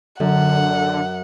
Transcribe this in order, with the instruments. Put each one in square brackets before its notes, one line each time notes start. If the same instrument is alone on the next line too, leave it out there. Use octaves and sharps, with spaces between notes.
[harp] F#2 [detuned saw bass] D3 [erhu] F#5